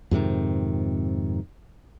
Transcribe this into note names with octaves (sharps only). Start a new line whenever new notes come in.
F2 G#2 C3 D#3